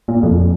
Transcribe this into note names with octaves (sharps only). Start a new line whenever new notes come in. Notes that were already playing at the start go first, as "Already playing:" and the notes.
A#2
F2